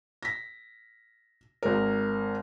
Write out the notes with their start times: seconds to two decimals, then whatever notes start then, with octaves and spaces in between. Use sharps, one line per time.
0.23 A#6 B6
1.63 G#1 A#4